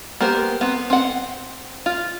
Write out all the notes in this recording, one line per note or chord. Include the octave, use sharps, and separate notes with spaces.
A#3 B3 G4 A#4 C5
B3 C4
C4 F#5
F4